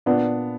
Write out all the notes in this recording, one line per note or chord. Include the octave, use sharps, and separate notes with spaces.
A#2 B3 D4